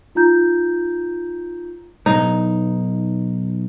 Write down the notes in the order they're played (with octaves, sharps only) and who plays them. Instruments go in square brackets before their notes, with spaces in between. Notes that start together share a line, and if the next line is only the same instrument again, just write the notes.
[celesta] D#4 F4 A#5 G6
[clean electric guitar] B1 [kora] D#4